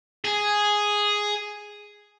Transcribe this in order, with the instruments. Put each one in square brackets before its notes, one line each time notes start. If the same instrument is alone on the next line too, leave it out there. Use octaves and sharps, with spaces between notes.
[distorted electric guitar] G#4